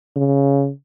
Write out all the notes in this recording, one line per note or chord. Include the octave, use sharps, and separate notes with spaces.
C#3